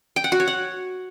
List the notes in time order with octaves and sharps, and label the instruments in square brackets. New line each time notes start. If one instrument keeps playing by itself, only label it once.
[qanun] G5
F#5
F#4
C#5
F#5